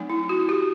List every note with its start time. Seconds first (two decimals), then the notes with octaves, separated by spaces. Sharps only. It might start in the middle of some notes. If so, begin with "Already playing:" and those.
Already playing: F#3 A3 C4 D#4
0.10 E4
0.29 F#4
0.49 G4